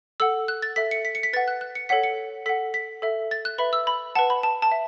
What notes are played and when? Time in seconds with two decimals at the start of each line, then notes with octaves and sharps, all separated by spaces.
0.20 A4 F#5 E6
0.48 F#6
0.62 A6
0.76 A4 E5 B6
0.91 C#7
1.05 B6
1.15 C#7
1.23 B6
1.33 B4 F#5 A6
1.48 F#6
1.61 F#6
1.75 C#7
1.89 A4 C#5 F#5 B6
2.03 C#7
2.46 A4 F#5 B6
2.74 B6
3.02 A4 E5
3.31 A6
3.45 F#6
3.58 B4 E5 B5
3.73 E6
3.87 B5
4.15 B4 F#5 A5
4.30 B5
4.43 A5
4.62 A5
4.72 E5